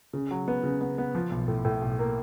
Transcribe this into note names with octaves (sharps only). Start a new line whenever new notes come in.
C#3
F#3
B3
C#3
B3
B3
F3
B1
A2
A2
B1
A#3